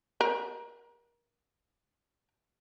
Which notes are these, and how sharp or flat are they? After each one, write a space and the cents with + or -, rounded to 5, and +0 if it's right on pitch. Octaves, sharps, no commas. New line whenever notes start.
A#4 +30